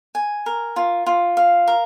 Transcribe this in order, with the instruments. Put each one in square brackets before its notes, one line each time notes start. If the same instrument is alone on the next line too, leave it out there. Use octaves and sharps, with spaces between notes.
[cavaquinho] G#5
A#4
F4
F4
F5
A#4